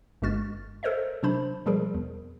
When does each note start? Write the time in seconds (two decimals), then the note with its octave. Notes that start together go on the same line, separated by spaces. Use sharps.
0.22 G1 G2 G#3 F#4 F6 A6
0.83 A4 A#4 C5 C#5 D#5 E5
1.23 C3 F#3 D4 C5 B5
1.66 B2 F3 G3 G#4 A#4
1.94 E2